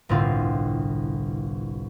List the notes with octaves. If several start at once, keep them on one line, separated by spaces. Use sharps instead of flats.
G1 C2 A2 C4 F4 F5